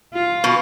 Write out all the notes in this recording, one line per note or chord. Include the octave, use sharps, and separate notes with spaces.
F4
B2